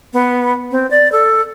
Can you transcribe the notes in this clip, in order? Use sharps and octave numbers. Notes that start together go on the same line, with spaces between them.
B3
C4
D5
A4